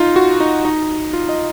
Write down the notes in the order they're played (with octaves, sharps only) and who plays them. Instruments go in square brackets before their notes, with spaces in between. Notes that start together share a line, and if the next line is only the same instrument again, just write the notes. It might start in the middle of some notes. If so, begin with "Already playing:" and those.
Already playing: [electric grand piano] D#4 F4
F#4
D#4
D#4
F4
D#5